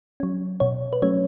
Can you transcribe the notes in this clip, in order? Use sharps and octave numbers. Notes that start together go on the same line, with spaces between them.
F#3 C#4
B2 C#5
B4
F#3 A3 C#4 C#5